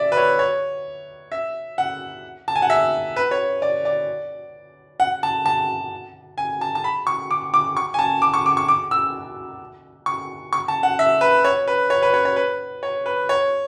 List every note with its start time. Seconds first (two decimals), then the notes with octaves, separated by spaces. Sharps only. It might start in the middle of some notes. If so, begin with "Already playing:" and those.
Already playing: D5 E5
0.12 B4
0.17 C#5
0.39 C#5
1.32 E5
1.78 F#5
2.48 A5
2.56 G#5
2.62 F#5
2.70 E5
3.16 B4
3.31 C#5
3.62 D5
3.85 D5
5.00 F#5
5.23 A5
5.46 A5
6.38 G#5
6.61 A5
6.75 A5
6.84 B5
7.07 C#6
7.31 D6
7.54 D6
7.77 C#6
7.94 G#5
7.99 A5
8.22 D6
8.34 C#6
8.46 D6
8.57 C#6
8.68 D6
8.91 E6
10.06 C#6
10.53 C#6
10.68 A5
10.83 F#5
10.99 E5
11.21 B4
11.44 C#5
11.68 B4
11.90 C#5
12.03 B4
12.14 C#5
12.25 C#5
12.36 B4
12.83 C#5
13.06 B4
13.29 C#5